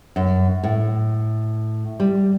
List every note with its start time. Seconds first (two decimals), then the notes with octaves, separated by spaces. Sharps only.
0.16 F#2
0.63 A2
2.00 G3